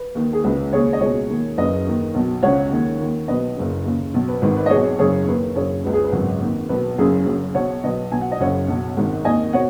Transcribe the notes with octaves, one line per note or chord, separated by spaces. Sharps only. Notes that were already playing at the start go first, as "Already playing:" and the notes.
Already playing: B4
D#2 D#3
G#4
C#2 C#3 B4
D#2 C#3 G#4 C#5
D#5
C#2 B2 G#4 C#5
D#2 D#3
F#1 F#2 C#3 B4 D#5
D#2 D#3
B1 B2
C#2 C#3 C#5 F#5
D#2 D#3
D#2 D#3
B1 B2 B4 D#5
F#1 F#2 C#3
D#2 C#3
B1 B2
B4
G#1 G#2 D#3 B4
B4
D#5
B1 B2 G#4 C#5
F#1 F#2 C#3 G#4 C#5
D#2 D#3 B4
F#1 F#2 C#3 G#4 C#5
C#2 C#3 B4
G#4
B4
G#1 F#2 C#3
D#2 D#3
B1 B2 B4
F#1 F#2 C#3 G#4
F#1 F#2 C#3
B1 B2 C#5 F#5
B1 B2 B4 D#5
B1 B2 G#5
F#5
D#5
F#1 F#2 C#3 C#5 F#5
B1 B2
G#1 G#2 D#3
D#2 D#3 D#5 G#5
B2 C#5 F#5